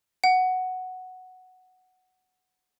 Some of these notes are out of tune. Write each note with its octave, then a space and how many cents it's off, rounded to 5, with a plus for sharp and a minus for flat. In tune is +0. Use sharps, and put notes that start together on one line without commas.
F#5 +0